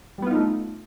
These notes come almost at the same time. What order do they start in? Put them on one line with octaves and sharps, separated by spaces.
G3 B3 F4 D#4 A3